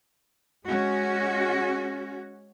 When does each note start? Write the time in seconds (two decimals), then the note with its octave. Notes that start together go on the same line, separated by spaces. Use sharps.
0.65 G#3 C#4 F#4